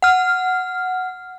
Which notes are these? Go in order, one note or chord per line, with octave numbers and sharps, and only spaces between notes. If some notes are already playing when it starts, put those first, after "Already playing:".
F#5 F6